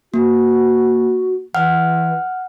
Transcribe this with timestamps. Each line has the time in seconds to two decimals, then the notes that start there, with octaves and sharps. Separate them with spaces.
0.14 A#3 F#4
1.55 E3 F#5 F6